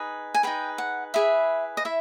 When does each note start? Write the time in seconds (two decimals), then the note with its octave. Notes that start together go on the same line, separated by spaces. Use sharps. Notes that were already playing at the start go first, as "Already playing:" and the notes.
Already playing: D#4 G#4 B4
0.35 G#5
0.43 D#4 G#4 B4 G5
0.78 F#5
1.14 E4 G#4 B4 E5
1.77 D#5
1.85 E4 E5